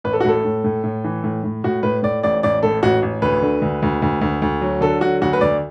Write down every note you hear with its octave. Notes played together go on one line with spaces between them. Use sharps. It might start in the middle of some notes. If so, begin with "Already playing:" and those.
A1 B4
A4
F#4
A2 A4
A2
A2
A2
E3
A2
A2
A2 F#4
A2 B4
A2 D5
A1 D5
A1 D5
A2 A4
A1 F#4
A1
D2 B4
D3
D2
D2
D2
D2
D2
F#3
D3 A4
F#3 F#4
D2 F#4
B4
D2 D5